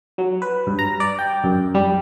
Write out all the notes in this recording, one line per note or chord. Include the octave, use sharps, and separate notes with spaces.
F#3
B4
G2
A#5
D5
G5
F#2
G3